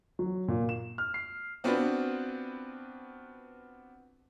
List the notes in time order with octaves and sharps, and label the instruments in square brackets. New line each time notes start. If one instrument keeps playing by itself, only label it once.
[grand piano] F#3
A#2
E7
F6
C7
[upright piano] B3 C4 D4 F4 F#4 B4